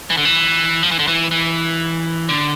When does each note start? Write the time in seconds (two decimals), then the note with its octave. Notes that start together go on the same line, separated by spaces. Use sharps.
0.10 E3
0.17 D3
0.25 E3
0.83 F3
0.91 E3
0.99 D3
1.07 E3
1.31 E3
2.29 D3